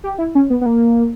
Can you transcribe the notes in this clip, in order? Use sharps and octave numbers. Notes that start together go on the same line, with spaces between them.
G4
E4
C#4
B3
B3
A#3